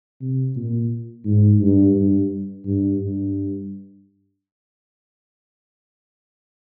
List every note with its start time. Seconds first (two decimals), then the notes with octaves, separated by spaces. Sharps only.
0.21 C3
0.56 A#2
1.25 G#2
1.60 G2
1.95 G2
2.65 G2
3.00 G2